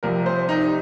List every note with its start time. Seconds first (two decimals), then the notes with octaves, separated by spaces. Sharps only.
0.03 C2 C3 F3 A#4
0.26 C5
0.49 D#4